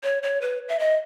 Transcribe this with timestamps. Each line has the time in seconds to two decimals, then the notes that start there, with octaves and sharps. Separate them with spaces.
0.03 C#5
0.23 C#5
0.42 B4
0.69 E5
0.79 D#5